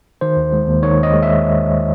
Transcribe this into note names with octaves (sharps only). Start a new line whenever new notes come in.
D#3 C5
D#2
G#3
D#2
D#3 C#5
D#2
D#5
G#3
E5